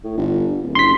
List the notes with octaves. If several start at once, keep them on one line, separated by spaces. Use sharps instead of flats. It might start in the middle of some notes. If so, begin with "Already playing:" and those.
A2
G1
D1
F#1 C6 B6